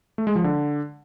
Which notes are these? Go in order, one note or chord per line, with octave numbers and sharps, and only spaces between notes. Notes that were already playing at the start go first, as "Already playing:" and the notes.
A3
G#3
F3
D3